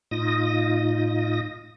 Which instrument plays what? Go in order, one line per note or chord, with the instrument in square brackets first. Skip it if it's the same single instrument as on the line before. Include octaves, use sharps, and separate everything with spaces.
[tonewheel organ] A2 D#4 F4 D#6 A#6